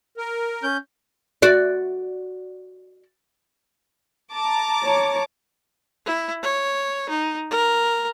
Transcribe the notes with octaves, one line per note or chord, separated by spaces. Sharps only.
A#4
C#4 G6
F#4 D5
A5 A#5 D6
C#5
E4
C#5
D#4
A#4